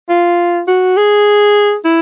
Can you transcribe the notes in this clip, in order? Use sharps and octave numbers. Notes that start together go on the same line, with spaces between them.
F4
F#4
G#4
E4